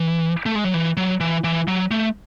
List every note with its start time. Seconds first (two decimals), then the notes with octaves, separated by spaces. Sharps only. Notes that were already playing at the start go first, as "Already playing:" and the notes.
Already playing: E3
0.46 A3
0.55 G#3
0.64 F#3
0.74 E3
0.97 F#3
1.20 E3
1.44 E3
1.68 F#3
1.91 A3